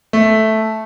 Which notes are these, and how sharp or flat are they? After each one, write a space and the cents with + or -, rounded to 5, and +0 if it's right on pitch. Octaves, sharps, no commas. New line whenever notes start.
A3 -5